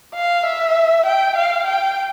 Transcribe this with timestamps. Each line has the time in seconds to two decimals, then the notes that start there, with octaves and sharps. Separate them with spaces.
0.14 F5
0.45 E5
1.06 G5
1.36 F5
1.66 G5